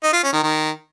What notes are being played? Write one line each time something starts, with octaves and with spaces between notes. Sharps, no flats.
D#4
F4
C#4
D#3
D#3